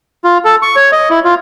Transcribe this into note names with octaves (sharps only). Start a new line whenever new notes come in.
F4
A4
C#6
C#5
D#5
E4
F4